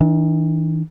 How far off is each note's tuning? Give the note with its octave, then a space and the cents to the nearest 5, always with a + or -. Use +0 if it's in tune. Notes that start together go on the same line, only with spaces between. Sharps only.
E3 -45 D4 +15